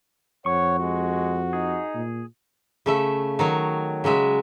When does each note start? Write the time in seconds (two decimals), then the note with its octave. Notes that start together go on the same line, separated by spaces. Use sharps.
0.46 F2 C#5 F#5 C#6
0.79 G#3 F#4
1.53 D#4 G#4
1.94 A#2
2.86 C#3 A3 E5
3.39 D#3 F#3 C#5
4.04 C#3 F#3 G#3 E5